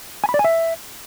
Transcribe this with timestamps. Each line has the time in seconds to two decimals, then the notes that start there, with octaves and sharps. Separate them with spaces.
0.24 G#5
0.29 B5
0.34 D5
0.39 G#5
0.44 E5